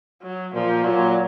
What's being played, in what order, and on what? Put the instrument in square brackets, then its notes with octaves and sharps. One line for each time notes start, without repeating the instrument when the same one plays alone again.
[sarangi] F#3
[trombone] A#2 [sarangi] F3
[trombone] A#2 [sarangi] F#3